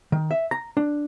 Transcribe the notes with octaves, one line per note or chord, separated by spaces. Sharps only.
D#3
E5
A#5
D4